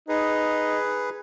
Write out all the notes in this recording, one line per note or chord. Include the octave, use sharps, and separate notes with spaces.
D#4 G#4 B4